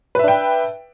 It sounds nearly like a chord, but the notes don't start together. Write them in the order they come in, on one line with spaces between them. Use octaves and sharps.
B4 E5 D4 G5